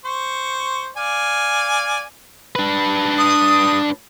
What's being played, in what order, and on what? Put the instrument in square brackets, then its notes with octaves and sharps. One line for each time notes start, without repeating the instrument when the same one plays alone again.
[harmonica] C5 C#6
D5 F5 G#5
[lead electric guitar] D4 B4
[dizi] D#6